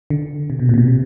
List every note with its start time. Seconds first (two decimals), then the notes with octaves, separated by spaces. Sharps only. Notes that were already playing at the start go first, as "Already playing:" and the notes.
0.10 D3
0.50 C3
0.59 B2
0.69 A#2
0.74 C3
0.78 B2
0.88 C3